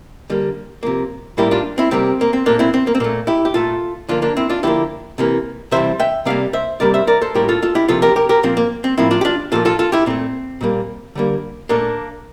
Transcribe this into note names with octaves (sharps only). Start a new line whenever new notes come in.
D3 G3 A#3
C3 F3 A#3
A2 G3 A#3 E4 G4
D4 F4
C4 E4
C3 G3 A#3 C4
A#3
C4
A#2 A3 A#3 D4
C4 E4
C4
A#3
C4
A#2 A3 A#3
E4 G4
G4
A#2 A3 F4 A4
D3 F3 A#3 D4 F4
A#3 D4
C4 E4
D4 F4
D3 F3 A#3 E4 G4
C3 E3 A#3
C3 E3 G3 C5 E5
E5 G5
C3 G3 A#3 D5 F5
C5 E5
C3 G3 A#3 A#4 D5
C5 E5
A#4 D5
A4 C5
A2 G3 A#3 G4 A#4
F4 A4
F4 A4
E4 G4
C3 F3 A#3 F4 A4
G4 A#4
G4 A#4
G4 A#4
A#2 F3 A#3 C4
A#3
C4
A2 F3 A#3 C4 E4
D4 F4
G4
D4 F4
A#2 F3 A#3 F4 A4
F4 A4
F4 A4
E4 G4
A#2 A3 C4
A#2 G3 A#3
D3 G3 A#3
A#2 A3 A#3 D4